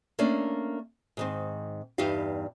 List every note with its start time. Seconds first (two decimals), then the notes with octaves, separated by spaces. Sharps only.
0.19 A3 A#3 C#4 D4 D5
1.17 G#2 D#3 C4
1.98 E2 G2 G3 D#4 G4 F5